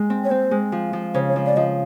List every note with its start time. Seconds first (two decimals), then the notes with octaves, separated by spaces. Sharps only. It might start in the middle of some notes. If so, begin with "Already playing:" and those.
Already playing: G#3
0.10 C4
0.24 C#5
0.31 C4 C5
0.51 G#3
0.72 F3
0.93 F3
1.14 C#3 C5
1.29 C#5
1.36 F3
1.46 D5
1.56 F3 D#5